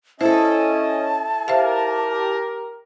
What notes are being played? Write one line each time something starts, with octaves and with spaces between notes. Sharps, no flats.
C#4 E4 A4 C5 D#5 A5
G4 A#4 C5 E5 F5